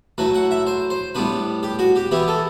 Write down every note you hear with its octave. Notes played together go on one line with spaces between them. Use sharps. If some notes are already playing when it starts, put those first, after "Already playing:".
F#3 A3 E4 B4
F#5
E5
C5
C5
A2 G3 B3 D4 B4
G4
F#4
G4
E3 B3 E4 G4
A4